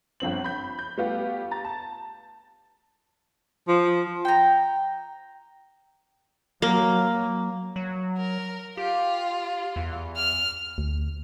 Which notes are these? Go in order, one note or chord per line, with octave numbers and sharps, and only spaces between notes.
G1 F3 C4 F#7
B5 G6
G6
G3 A3 B3 F4 G4
A#5 A6
A5
F3
G5 A#5
F#3 A#3
F#3
A#4
F4 G4
E2
F6
D2